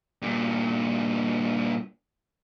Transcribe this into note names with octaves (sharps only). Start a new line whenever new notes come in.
G2 A#2